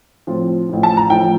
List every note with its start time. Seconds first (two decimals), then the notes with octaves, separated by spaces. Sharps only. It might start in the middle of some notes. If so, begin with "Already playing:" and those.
0.27 A2 F3 C4 F4
0.69 A1 A2 F3
0.83 A5
0.97 A#5
1.10 A1 A2 F3 G5